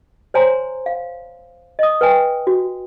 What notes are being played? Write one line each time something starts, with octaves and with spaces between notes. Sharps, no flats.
C5 C#5 G#5 A#5 C6
F5
D#5 D#6
B4 G5 G#5
F#4